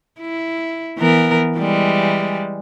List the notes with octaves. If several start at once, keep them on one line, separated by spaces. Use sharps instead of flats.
E4
E3 B3 A#4
E3 G3 G#3